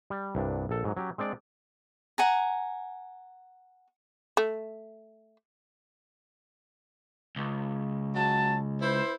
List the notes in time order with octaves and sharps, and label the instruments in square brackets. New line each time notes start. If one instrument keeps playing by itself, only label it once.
[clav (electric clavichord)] G3
C2 G2 D4
A#1 A4
G#2 F#3
F#3 C#4 G4
G#3 C4 D4 D5
[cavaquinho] F#5 G#5 A#5
[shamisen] A3
[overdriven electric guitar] C#2
[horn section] F#3 G#3 A5
E4 B4 C5